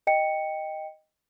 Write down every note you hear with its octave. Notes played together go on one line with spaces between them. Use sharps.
D#5 G5 C#7